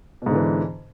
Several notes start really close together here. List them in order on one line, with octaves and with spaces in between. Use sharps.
B2 G#2 D3 E3